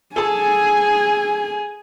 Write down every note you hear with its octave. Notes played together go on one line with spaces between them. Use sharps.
G#4 A4 G#5 A5